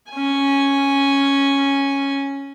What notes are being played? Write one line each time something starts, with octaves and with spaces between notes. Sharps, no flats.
C#4 G#5